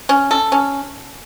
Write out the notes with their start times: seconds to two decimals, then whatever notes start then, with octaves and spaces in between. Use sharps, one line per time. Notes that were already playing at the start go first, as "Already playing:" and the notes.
0.09 C#4
0.31 A4
0.52 C#4